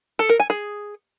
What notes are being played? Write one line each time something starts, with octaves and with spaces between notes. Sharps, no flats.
A4
A#4
G#5
G#4